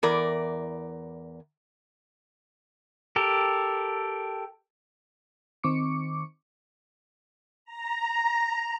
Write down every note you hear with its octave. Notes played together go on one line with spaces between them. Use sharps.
E2 A#4 D5
G4 A4 A#4
D#3 C4 C#6 D6 C#7
A#5